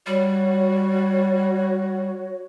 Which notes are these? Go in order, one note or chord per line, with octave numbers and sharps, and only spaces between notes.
G3 F#4 C#5